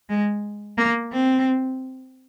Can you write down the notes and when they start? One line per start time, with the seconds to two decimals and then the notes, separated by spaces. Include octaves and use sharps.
0.10 G#3
0.78 A#3
1.12 C4